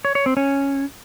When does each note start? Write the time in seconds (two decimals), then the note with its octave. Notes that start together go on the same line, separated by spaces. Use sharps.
0.05 C#5
0.15 C#5
0.26 C4
0.37 C#4